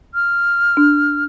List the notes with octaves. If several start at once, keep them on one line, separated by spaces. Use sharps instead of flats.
F6
D4